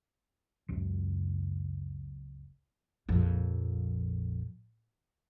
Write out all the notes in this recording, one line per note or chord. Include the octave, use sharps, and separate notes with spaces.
F#1 C#2 F#2
A#1 F2